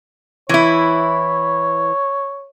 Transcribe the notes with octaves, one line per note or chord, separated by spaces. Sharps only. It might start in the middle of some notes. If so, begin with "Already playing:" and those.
E3 E4 C#5